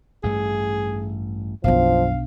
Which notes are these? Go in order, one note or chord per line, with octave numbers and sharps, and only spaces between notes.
A1 G2 A3 G#4
B1 F#2 F3 D4 F5